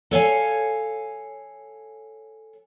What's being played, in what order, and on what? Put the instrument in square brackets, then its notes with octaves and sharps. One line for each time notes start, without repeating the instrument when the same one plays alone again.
[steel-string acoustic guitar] A4 C#5 F5 G#5